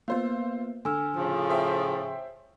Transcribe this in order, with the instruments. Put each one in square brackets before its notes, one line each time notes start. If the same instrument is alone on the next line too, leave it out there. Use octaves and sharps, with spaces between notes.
[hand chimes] A#3 B3 [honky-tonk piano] F4 C5
[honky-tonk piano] D3 [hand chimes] G#5 E6 F6
[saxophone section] A2 C#3 F3
[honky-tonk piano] C5 E5 G5